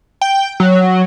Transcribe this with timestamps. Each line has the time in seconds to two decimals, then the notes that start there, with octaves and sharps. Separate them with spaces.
0.21 G5
0.60 F#3